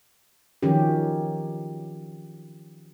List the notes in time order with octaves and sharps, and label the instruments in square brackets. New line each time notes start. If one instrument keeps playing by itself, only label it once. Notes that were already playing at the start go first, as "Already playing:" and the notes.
[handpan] D#3 F3 F#3 C#4 G4